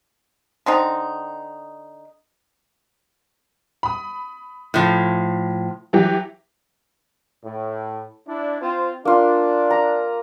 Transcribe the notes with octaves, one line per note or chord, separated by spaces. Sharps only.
D3 C4 D#4
B5 D#6
A2 F3
E3 F#3 G4
A2
D4 E4
C4 F4 C5
A#3 D4 F4
A#5